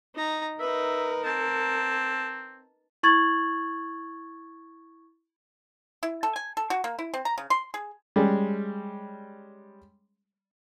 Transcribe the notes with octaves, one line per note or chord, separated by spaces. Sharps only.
D#4 A#5
D#4 A#4 B4 E5
C4 A5
E4 C#6 G#6 A6 F#7
E4
A4
G#5
A4
F#4
A#3
E4
C4
A#5
C#3
C6
G#4
G3 G#3 C#4